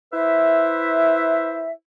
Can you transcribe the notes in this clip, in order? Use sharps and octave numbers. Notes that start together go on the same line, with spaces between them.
E4 B4 C5 E5